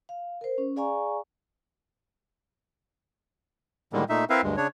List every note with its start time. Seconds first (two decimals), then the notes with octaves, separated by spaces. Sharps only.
0.09 F5
0.41 A#4 C5
0.58 C#4
0.76 G#4 D5 F5 G#5 A#5 C#6
3.93 A2 D3 D#3 G3 G#3 A#3
4.09 A#2 A3 D#4 E5
4.30 C4 E4 A#4 B4 E5 F5
4.43 D2 G2 G#3
4.57 C#3 D4 C#5